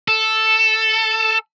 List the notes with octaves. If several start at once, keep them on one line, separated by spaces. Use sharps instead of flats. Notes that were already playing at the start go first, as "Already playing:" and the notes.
A4